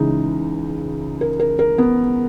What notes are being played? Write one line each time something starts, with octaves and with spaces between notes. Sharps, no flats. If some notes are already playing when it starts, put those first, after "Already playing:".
Already playing: C#2 C#3 E3 D#4
A#4
A#4
A#4
B3